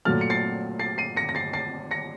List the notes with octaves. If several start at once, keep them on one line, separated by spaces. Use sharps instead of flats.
A#2 F#3 A3 F6 A6
C#7
A6 C7
A6 C7
C7 D#7
A#6 C#7
A#6
A6 C7
A6 C7
A#6 C#7